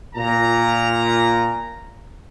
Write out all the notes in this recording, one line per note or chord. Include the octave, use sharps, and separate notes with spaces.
A#2 A#5